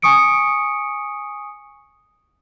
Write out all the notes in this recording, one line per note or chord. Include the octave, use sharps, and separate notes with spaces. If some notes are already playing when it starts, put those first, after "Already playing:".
G#5 C#6 D#6 C#7 D7